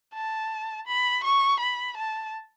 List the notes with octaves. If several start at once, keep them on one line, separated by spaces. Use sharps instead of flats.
A5
B5
C#6
B5
A5